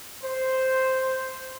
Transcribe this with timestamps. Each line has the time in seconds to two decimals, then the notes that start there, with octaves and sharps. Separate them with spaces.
0.23 C5